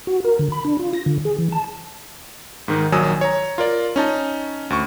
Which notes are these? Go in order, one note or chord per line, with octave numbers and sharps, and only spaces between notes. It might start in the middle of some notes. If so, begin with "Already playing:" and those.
F#4
A#4
D3
B5
D4
F4
A#6
D3
G#4
E3
A5
G#2 D#3 D#4
A#1 D#3 F#3 G#5 D#6 E6
C#5 A#5
F4 A#4 D5
C#4 D#4 A5
D2 C#6